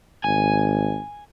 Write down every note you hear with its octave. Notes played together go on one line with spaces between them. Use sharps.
G#1 G#5